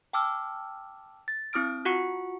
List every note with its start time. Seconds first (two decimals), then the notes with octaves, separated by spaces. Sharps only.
0.13 G5 A5 D6 E6 F6
1.28 A6
1.53 C4 E4 D#6 F6 D7
1.85 F4 F#4 F#5 C#6 C#7